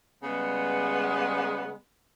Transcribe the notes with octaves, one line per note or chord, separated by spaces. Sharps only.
C#3 G3 G#3 B3